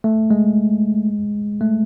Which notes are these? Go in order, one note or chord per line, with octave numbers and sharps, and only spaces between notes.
A3
G#3
A3